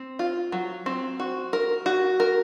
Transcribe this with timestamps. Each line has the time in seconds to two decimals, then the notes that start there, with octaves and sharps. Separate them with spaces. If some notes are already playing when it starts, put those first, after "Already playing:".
Already playing: C4
0.19 F4
0.52 F#3
0.86 C4
1.20 F#4
1.53 A#4
1.86 F#4
2.20 A#4